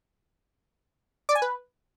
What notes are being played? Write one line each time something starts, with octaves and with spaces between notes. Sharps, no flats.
D5
G#5
B4